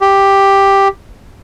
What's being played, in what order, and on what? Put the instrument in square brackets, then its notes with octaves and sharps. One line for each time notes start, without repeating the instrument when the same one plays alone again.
[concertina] G4